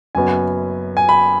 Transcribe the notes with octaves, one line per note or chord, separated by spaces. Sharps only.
F#1 F#2 F#3 B3 G#5
G#5
B5